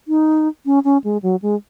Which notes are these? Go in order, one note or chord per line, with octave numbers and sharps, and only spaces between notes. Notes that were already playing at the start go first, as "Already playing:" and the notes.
D#4
C#4
C#4
G#3
F#3
G#3